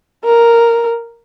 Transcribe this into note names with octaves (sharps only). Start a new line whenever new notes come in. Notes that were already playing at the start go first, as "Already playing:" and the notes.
A#4